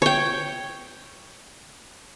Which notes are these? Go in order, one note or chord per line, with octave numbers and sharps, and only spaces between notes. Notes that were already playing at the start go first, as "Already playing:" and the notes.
C#5 G5